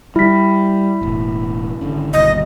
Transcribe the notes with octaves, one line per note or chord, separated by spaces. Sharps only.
G3 E4 B6
E1 A2
G#1 D3 C#4
G1 D#2 B2 D#5